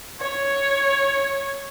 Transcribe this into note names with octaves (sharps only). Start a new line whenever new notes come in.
C#5